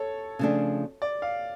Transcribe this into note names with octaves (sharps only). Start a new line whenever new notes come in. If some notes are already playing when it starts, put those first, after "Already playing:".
Already playing: A4 C#5
C#3 F3 A3 D4 G#4
D5
F5